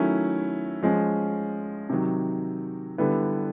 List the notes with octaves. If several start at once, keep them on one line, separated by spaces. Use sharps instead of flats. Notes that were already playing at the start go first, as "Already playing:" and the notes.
Already playing: D#3 F#3 A3 C#4 E4
F3 G#3 C#4
C3 D#3 F#3
D3 G3 B3 E4